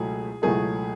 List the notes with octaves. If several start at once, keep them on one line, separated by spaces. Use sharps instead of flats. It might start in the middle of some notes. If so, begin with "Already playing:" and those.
Already playing: C#2 B2 F#3 A3 E4 G#4
C#2 B2 F#3 A3 E4 G#4